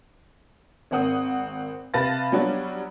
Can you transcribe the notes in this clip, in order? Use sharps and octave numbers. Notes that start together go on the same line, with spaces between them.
G#1 A#3 C4 F#5 D#6
C3 B4 F5 A5 A6 A#6
F#3 G3 B3 C#4 D4 F#4